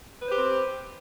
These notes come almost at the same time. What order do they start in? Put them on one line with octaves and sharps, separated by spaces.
B4 C5 G4 C4